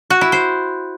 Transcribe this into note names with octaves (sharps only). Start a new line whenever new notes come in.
F#4
E4
C5